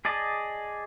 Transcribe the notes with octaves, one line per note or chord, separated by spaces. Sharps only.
G#4 D5 D#5 A5